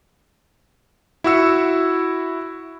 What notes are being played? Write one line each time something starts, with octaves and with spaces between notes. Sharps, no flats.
E4 F#4 E6 C#7